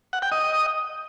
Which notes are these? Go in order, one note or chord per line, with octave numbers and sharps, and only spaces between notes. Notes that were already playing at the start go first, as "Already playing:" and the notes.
F#5
G5
D#5